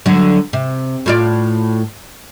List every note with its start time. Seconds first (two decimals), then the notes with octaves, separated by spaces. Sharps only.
0.06 D3 F#3
0.53 C3
1.06 A2 F4 D5